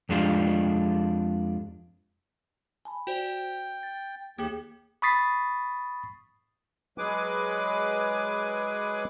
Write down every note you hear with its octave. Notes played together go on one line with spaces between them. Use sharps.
F2 G#3 D4 F4 G4
G#5 A5 B5
F#4 C5 D5 G5
A6
D#2 A#3 G4 G#4
B5 C#6 D#6 A6 B6 C7
F#3 G#3 G#4 B4 G#5 D6